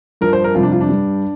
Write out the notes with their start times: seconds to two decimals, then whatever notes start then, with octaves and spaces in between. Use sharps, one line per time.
0.21 G2 F3 A#4
0.33 C5
0.44 A#4
0.55 F2 C3 G3 F4
0.63 D4
0.72 F4
0.81 D4
0.89 G2 G3